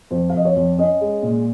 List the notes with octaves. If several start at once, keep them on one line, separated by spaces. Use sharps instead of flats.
F2 C5
F5
F2 D#5
C#5
F2
C#4 D#5
G#3
A#2